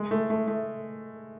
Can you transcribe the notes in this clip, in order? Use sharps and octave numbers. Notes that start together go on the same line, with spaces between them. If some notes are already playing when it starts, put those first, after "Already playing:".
Already playing: G#3
A3
A3
A3